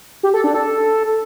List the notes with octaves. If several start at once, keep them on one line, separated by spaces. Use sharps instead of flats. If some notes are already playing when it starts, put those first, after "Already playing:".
G4
A4
D4
A4